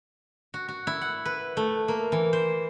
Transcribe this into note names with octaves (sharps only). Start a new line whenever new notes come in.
F#4
F#4
E4
F#5
B4
A3
A#3
E3
C5